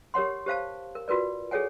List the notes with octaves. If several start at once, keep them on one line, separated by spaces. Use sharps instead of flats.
G4 A#4 C#5 F#5 C6
G4 C5 F5 A5
A#4
F4 F#4 A#4 B4 D5
G#4 A4 C#5 F#5 G#5